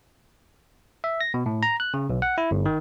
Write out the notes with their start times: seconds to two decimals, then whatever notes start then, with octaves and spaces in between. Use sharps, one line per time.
1.04 E5
1.21 A#6
1.34 B2
1.46 A2
1.63 A#5
1.80 F#6
1.94 C#3
2.10 B1
2.22 F#5
2.38 E4
2.51 G1
2.66 D#3